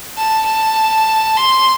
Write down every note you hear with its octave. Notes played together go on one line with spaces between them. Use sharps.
A5
A5
C6